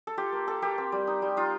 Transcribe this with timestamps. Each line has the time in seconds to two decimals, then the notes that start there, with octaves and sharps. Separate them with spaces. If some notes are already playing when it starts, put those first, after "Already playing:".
0.07 A4
0.18 F4 G4
0.33 A#3
0.47 A#3 A4
0.62 A#3 G4
0.78 C4
0.92 G3
1.07 D#4
1.22 G3
1.37 D#4 F4